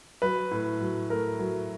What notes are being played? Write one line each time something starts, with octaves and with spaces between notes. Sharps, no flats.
F#3 B4
A2
F#3
A3 A#4
F#3